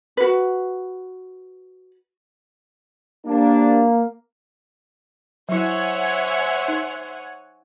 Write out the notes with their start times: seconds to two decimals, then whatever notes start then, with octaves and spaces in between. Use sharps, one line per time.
0.17 F#4 B4
3.25 F2 G3 A#3 D4
5.49 F#3 E4 C5 C#5 E5 F#5 G#5
6.68 D#4